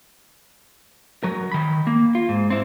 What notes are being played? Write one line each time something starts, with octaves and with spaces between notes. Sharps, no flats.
F#3 A#4
D#3 B5
A#3
F4
G#2
C4 E4